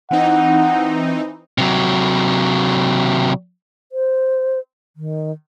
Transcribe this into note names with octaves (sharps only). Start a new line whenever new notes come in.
E3 C4 D#4 F#5
C3 F#3
C5
D#3